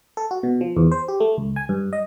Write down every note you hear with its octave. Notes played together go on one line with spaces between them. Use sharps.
A4
F#4
B2
F3
E2
C5
G4
A3
C#2
G#5
G2
D#5